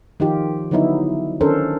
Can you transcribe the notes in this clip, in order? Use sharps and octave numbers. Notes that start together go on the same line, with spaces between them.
D#3 F3 D#4 F4 G4
D3 F#3 B3 D#4 E4
D#3 C#4 D4 A4 A#4 C5